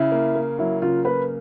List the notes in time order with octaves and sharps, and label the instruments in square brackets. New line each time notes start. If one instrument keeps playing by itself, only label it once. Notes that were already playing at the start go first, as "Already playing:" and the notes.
Already playing: [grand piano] C#3 [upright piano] E4
[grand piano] A#3
A#3
[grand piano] F#3 [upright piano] E4
[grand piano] C#3 [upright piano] F4
[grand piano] A#3 [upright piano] B4